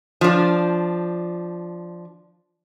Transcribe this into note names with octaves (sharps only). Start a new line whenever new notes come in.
F3 D4